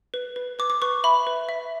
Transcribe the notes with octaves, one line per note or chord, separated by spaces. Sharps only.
B4
B4
B4 D6
D6
B4 C#6
E5 B5
B4
E5